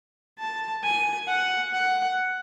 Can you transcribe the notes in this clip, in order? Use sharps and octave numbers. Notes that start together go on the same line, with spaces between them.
A5
G#5
F#5
F#5